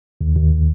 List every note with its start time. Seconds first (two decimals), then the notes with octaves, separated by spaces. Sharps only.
0.21 D#2
0.36 D#2